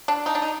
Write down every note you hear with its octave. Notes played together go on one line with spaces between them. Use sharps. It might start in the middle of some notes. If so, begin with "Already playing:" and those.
D4
D#4
D4
D#4